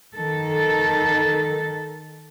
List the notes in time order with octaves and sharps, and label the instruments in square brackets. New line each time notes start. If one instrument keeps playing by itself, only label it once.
[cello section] D#3 A4